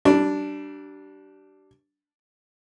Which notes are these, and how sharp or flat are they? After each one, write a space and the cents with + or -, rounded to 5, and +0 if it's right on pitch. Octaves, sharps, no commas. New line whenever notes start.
G3 -40 D4 +0